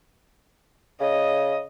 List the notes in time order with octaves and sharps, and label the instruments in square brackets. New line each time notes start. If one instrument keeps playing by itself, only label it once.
[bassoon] C#3 [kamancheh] D#5